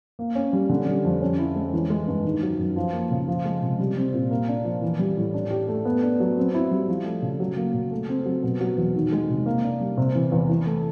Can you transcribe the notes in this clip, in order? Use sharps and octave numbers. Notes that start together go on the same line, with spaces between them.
A#3
C#4
G3
D3
G3
F2
C#4
E4
G#3
E3
G#3
G2
D#3
F#3
F#2
F3
A#3
C#3
F3
G#3
C3
G3
C4
A#2
A#3
D4
F3
E3
G3
A2
D4
G4
A3
B3
D4
F#3
C4
E4
G3
F3
A3
C#3
F#3
A#3
C#3
A3
C4
F#3
B2
F#3
E2
D#3
G#3
C3
A#3
D4
G3
C3
E3
E2
E3
A3